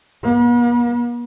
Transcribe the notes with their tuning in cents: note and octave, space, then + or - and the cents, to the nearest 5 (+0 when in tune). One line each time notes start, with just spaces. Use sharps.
B3 -45